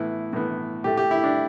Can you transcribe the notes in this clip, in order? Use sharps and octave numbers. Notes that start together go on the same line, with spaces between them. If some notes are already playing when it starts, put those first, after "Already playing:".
Already playing: A2 E3 B3 E4
A2 E3 B3
A2 A3 G4
G4
E4
D4